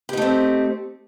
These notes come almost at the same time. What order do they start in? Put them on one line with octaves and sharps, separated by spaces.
G4 D#4 A3 C4